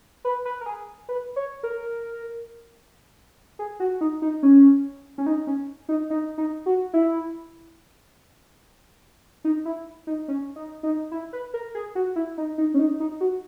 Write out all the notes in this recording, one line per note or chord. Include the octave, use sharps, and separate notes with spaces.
B4
B4
A#4
G#4
B4
C#5
A#4
G#4
F#4
D#4
D#4
C#4
C#4
D#4
C#4
D#4
D#4
D#4
F#4
E4
D#4
E4
D#4
C#4
D#4
D#4
E4
B4
A#4
G#4
F#4
E4
D#4
D#4
C#4
D#4
D#4
F#4